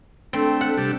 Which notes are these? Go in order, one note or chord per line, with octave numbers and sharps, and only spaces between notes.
A3 C4 D4
F#5
C3 G3 A4